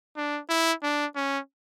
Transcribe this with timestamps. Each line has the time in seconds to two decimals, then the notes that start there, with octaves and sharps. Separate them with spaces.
0.17 D4
0.49 E4
0.83 D4
1.16 C#4